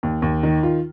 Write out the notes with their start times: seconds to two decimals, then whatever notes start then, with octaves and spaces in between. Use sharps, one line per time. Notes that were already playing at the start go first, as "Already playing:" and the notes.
0.03 D#2
0.22 D#2
0.43 D#3
0.63 F4